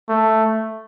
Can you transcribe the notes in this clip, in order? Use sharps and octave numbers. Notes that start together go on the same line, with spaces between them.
A3